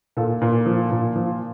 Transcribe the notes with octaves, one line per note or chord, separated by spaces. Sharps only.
A#2 F4 A4
A#2
F3
A#2
F3